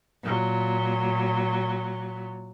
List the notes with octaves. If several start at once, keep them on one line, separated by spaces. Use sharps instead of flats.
A#2 F#3